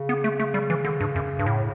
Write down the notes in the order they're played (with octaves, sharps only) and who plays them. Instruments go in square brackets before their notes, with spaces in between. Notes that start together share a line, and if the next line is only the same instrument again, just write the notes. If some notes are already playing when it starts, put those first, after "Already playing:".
Already playing: [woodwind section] C#3
[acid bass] B3
A3
A3
G3
E3
D3
G2
F#2
G2
A2